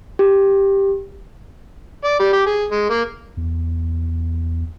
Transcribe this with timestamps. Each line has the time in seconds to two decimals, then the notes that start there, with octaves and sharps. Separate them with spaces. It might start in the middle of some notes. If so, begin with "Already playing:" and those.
0.19 G4
2.04 D5
2.20 G3
2.33 G4
2.46 G#4
2.72 G#3
2.90 A#3
3.37 E2